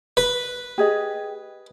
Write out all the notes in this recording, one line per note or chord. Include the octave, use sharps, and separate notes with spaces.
B4
G4 G#4 D#5